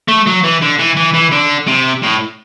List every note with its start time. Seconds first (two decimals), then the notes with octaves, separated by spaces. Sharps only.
0.08 A3
0.27 F#3
0.44 E3
0.62 D3
0.79 E3
0.97 E3
1.14 E3
1.32 D3
1.67 C3
2.03 A2